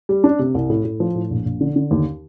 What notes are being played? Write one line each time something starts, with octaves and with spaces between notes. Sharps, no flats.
G3
D4
C3
C2
A2
A2
F3
A2
A#1
A#1
D3
D3
D#2